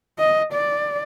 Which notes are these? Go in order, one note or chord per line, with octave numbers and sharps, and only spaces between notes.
D#5
D5